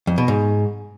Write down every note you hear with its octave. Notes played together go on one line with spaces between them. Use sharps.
F2
B2
G#2